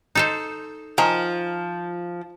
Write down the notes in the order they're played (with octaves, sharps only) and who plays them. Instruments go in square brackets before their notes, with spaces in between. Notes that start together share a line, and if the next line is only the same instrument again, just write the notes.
[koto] D#4 A4 C5
[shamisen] D#3 G#5 A#5 [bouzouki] F3